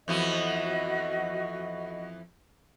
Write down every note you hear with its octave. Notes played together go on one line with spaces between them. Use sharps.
F2 E3 B3 F#4 D#5